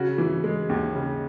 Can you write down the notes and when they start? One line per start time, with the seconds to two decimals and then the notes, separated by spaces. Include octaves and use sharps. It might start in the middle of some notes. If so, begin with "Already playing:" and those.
Already playing: C#3 F#4
0.18 E3
0.44 G#3
0.69 D#2
0.95 C#3